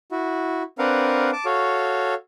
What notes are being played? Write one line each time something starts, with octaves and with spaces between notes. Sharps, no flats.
E4 F#4
C4 D4 A#4 B4 F5 F#5
A5 D6
F#4 A4 C#5 F5